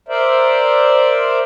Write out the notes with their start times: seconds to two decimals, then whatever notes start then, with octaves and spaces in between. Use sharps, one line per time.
0.09 A#4 C5 D5 E5